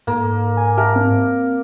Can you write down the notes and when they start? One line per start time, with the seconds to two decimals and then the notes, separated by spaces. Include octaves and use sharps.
0.07 G#2 A#3
0.57 G#5
0.77 G4 A#4 E5 A5
0.96 C4